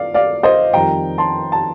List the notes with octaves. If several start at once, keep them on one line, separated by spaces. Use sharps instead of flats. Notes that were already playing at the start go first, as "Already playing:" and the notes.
Already playing: D5 F5
D5 F5
C5 D#5
F2 D#3 G3 G5 A#5
A5 C6
A5